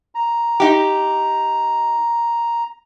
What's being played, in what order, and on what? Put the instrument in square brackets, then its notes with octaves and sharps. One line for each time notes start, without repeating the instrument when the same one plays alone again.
[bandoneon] A#5
[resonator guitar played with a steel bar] D#4 G4